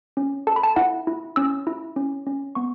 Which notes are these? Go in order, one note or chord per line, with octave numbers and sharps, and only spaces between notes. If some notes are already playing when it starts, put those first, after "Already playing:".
C#4
A4 A5
B5
A5
E4 F#5
E4
C#4 E6
E4
C#4
C#4
B3 C#6